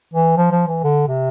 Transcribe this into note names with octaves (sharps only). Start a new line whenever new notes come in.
E3
F3
F3
E3
D3
C3